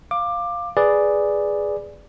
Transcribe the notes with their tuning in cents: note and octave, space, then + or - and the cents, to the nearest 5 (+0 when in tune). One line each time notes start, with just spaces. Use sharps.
F5 +0 D6 +15
G#4 +0 B4 +0 D5 +0